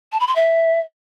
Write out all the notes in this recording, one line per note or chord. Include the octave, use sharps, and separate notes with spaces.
A5
B5
C6
E5